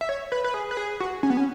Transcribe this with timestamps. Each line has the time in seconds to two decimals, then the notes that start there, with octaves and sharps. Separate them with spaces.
0.01 E5
0.09 C#5
0.32 B4
0.44 B4
0.54 G#4
0.71 B4
0.77 G#4
1.00 F#4
1.23 C#4
1.30 B3
1.37 C#4